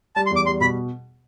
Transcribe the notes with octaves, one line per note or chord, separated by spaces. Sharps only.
G3 A5
C6
E2
D6
G3 C6
B2 B5